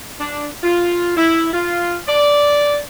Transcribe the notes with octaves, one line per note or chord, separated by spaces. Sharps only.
D4
F4
E4
F4
D5